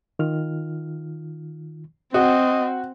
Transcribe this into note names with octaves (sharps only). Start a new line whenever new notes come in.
D#3 F4 F6
C4 F#4 D#5